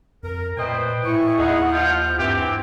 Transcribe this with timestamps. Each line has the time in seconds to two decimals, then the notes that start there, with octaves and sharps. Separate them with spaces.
0.23 F2 A#4
0.57 A#2 A3 B4 C5 D#5 G5
1.04 A2 E4 G#5 C#6
1.38 D#2 D#4 G#4 F#5
1.72 F3 F4 G6
2.19 G2 E3 C4 G4